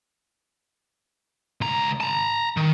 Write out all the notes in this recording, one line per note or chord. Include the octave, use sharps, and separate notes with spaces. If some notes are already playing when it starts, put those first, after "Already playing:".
C#2 A#5
A5 A#5
D#3